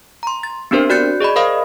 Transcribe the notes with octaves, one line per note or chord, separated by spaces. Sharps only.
A#5 C6
A6
B3 C4 D4 G4 A#4 C5
F#4 D5 F#6 G6 A6 C#7
G#4 D5 D#5 B5
A#4 C5 D#5 F5 B5 D#6